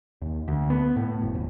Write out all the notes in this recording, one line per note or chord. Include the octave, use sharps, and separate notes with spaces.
D#2
D2
B3
A2
F#1
D#1